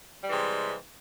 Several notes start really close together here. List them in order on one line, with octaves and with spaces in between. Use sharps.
G3 E3 G#3 C3